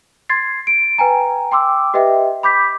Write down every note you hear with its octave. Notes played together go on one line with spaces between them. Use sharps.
C6 G#6 A6 C7
D7
B4 G5 G#5 A#5
G5 C6 D6 E6
G4 B4 D#5 E5 G5
B5 D6 G6 B6